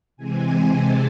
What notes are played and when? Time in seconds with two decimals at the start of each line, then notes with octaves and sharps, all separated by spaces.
0.17 C3 E3 G#3 C4 G#5
0.79 A5